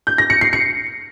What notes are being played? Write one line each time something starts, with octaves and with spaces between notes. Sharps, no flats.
G6
A#6
C#7
C7
C#7